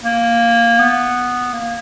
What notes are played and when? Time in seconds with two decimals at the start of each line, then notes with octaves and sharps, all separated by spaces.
0.04 A#3
0.79 B3
1.53 A#3